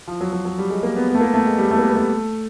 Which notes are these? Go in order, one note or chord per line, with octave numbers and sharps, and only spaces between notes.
F3
F#3
F#3
F#3
G3
G#3
A#3
B3
B3
A3
A#3
A3
G#3
G3
A3
A#3
B3
A#3
A3